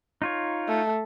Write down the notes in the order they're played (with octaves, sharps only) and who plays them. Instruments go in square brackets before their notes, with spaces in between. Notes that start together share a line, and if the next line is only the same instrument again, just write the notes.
[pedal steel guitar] D#4 F4 C#5
[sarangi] A3